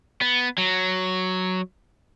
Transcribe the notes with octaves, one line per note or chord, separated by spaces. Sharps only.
B3
F#3